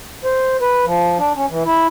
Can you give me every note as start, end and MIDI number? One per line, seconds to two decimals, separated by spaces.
0.24 0.57 72
0.61 0.85 71
0.86 1.18 53
1.18 1.33 62
1.36 1.46 61
1.50 1.63 52
1.65 1.87 64